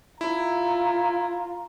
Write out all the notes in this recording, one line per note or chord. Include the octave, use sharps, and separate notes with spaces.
E4 F4 A#5